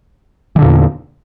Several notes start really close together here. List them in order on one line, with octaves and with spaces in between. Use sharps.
E3 D3 A#2 E2